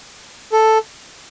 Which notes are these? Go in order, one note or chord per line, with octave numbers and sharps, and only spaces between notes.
A4